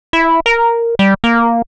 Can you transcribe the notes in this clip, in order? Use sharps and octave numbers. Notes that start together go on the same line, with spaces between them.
E4
A#4
G3
A#3